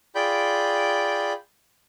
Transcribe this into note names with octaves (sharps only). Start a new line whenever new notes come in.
F4 G#4 D5 G5 B5 G6